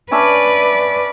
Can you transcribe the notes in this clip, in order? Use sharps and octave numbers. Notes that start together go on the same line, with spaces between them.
C#4 D4 B4 D5 E5